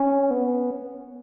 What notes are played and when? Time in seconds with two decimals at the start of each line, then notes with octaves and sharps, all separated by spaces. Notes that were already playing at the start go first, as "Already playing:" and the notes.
Already playing: C#4
0.31 B3